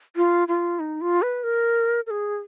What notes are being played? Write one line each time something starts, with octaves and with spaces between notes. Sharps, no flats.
F4
F4
D#4
F4
B4
A#4
A#4
G#4